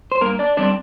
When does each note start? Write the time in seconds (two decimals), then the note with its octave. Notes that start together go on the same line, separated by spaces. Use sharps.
0.12 C5
0.21 G2 A#3 A#4
0.39 D4 D5
0.57 D3 G3 C4 D4 D5